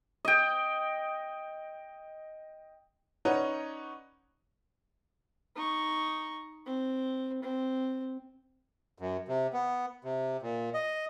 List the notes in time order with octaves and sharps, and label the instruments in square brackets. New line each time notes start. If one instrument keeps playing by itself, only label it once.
[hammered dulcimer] D#5 G5
[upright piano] C#4 D#4 B4 C#5 D5 F#5
[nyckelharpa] D#4 C#6
C4
C4
[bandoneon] F#2
C3
B3
C3
A#2
D#5